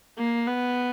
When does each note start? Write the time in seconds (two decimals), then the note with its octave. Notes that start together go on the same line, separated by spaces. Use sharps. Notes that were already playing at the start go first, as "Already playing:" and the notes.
0.18 A#3
0.46 B3